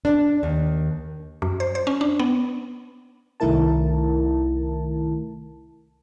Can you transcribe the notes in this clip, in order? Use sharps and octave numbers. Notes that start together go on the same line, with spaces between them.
D4
D#2
F#2
C5
C5
C#4
D4
B3
C2 D#3 A3 E4 A#4 A5